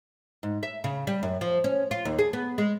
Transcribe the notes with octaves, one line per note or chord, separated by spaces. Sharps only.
G#2
E5
C#3
G3
F#2
F3
C#4
F4
D#2
G#4
B3
G#3